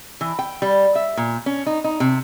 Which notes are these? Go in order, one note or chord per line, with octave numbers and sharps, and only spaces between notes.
E3
G5
G3
E5
A#2
C#4
D#4
D#4
C3